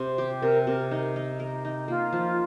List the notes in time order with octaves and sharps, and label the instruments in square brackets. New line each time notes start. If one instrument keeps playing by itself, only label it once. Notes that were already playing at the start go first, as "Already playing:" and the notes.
Already playing: [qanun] C3 [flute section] C5
[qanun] G4
[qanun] C3 [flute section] A#4
[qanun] C3 [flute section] A#4
[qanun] D#4
D#4
A#4
D#4
[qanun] A#3 [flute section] F4
[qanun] F3